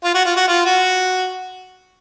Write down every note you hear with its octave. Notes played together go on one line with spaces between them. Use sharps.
F4
F#4
F4
F#4
F4
F#4